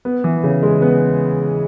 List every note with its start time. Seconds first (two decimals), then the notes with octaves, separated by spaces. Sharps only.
0.05 B3
0.24 E3
0.44 C#3
0.63 G#3
0.82 B3